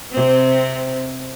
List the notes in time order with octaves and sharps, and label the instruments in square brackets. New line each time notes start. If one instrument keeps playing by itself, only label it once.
[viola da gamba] C3 C4